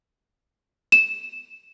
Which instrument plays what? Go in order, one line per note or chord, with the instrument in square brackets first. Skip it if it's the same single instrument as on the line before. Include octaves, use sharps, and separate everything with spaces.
[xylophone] E7